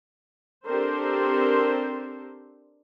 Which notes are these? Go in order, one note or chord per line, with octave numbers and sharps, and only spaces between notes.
C4 D4 G4 A4 A#4 C5